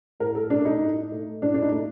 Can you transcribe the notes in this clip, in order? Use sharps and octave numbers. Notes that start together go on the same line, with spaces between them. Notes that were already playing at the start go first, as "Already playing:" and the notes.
A2 A#4
A4
A3 D4
D#4
A2
A3
A2 D4
D4
D#4
A3